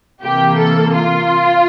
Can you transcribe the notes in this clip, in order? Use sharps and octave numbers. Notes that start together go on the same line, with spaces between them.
C3 E3 A#3 G4
A4
F4